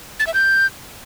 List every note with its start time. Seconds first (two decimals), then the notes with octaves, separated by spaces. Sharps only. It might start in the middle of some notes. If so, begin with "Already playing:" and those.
0.20 A6
0.27 E5
0.34 G6